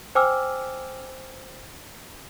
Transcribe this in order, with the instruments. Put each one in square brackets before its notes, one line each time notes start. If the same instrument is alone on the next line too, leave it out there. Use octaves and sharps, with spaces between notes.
[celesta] C5 G5 G#5 D6 E6 F6